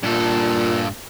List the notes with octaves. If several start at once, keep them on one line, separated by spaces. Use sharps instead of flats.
G2 A#2 A4